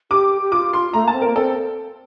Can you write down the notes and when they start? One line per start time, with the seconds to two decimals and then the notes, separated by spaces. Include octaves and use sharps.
0.11 G4 D6
0.42 G4
0.52 F4 D6
0.73 C6
0.93 A3 A#5
1.04 A#3 A5
1.14 C4
1.22 A#3 A#4
1.36 C4 A4